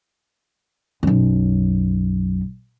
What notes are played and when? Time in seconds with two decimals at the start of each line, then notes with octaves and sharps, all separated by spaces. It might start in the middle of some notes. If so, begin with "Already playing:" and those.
1.03 B1 F#2